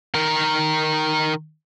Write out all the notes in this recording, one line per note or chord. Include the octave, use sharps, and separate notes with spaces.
D#3 A#4